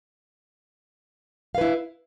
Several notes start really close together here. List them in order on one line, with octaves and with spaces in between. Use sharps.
F5 B4 E4